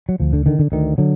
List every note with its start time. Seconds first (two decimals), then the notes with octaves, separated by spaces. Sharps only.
0.09 F#3
0.20 D2 F3
0.33 D3
0.46 D3 D#3
0.59 D3
0.72 D2 D#3
0.98 D3 F#3